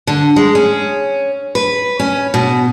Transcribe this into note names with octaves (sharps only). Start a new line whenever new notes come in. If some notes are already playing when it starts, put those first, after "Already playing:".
D3
G#3
C#4
B4
C#4
B2